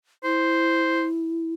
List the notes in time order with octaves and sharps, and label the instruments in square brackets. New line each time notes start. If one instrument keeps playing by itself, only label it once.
[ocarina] E4 [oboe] C5